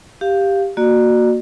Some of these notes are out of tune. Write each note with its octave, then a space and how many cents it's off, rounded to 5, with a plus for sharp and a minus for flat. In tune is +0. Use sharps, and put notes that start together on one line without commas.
G4 +5 F5 +0
A#3 +0 F#4 -5 D5 +35